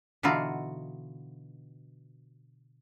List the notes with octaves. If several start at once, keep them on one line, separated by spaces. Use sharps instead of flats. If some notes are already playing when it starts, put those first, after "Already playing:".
B2 D3 E3 D#4 F4 F#4